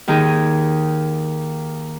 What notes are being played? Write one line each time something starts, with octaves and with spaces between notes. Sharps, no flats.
D#2 D#3 D#4 G#4